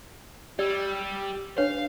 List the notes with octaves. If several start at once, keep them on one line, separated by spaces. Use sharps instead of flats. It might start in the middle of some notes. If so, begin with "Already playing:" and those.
G3 G4 D5 E6
D4 B4 C#5 F5